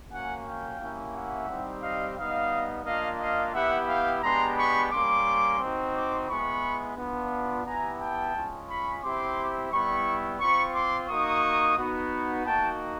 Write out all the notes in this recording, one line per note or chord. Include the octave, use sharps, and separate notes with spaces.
A#3 C#4 F#4 F#5 G#5
F5 G5
A#3 C#4 E4 G4
E5 F#5
G3 C4 D#4 G4
D#5 F5
G3 B3 D#4 D#5 F5
A#3 D4 F4 D#5 F5
D#5 F5
B3 E4 G4 E5 F#5
F5 G5
G#3 B3 D4 G4 A#5 C6
B5 C#6
G3 A#3 C#4 C6 D6
C4 D#4 F#4
C6 D6
G#3 B3 E4 B5 C#6
B3 D4 F4
B3 E4 G4 G#5 A#5
G5 A5
G#3 C#4 F4
B5 C#6
C4 E4 G4 C6 D6
G3 B3 E4 B5 C#6
C4 F4 B5 C#6
C6 D6
A#3 D#4 F#4 C#6 D#6
B3 D#4 F#4
A#3 D#4 F#4 G5 A5